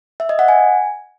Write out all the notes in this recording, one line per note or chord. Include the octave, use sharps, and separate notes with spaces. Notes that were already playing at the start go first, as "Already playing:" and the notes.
E5
D#5
F#5
G#5